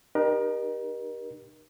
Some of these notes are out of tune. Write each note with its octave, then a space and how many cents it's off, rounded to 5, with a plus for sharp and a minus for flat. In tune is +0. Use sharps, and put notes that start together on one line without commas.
D#4 -30 G4 +0 A#4 +30